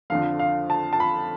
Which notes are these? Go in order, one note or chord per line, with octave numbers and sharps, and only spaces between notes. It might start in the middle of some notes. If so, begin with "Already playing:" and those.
F2 D3 F3 F5
F5
A5
A5
B5